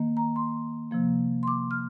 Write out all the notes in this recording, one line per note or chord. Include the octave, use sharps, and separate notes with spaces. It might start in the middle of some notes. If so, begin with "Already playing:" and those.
Already playing: D#3 A#3
A#5
C6
C3 F3 A#3
C6
D6
F6